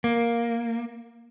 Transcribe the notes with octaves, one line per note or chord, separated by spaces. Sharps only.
A#3